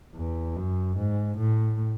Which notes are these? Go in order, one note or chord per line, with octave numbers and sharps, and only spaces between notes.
E2
F#2
G#2
A2